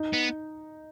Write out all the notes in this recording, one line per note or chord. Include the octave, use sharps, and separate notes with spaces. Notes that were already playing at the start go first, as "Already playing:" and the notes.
Already playing: D#4
B3